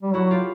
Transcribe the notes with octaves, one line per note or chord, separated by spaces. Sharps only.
G3
F#3 E4 F#4
F4 G4